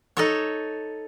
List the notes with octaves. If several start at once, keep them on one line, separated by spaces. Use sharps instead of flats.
D#4 A4 C#5